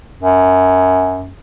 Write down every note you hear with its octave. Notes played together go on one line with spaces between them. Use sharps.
F#2